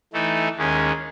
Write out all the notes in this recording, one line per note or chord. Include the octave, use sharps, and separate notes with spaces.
E3 A3 D#4 A4
D#2 D#3 G#3 C#4